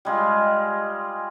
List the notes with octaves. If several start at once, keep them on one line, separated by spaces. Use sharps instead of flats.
G3 G#3 F4